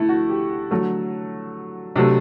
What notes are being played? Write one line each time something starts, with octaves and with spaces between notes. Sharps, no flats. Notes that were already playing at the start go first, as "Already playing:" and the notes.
Already playing: D3 A3 E4
F#4
G4
D3 F#3 A3
C3 F#3 A3 D4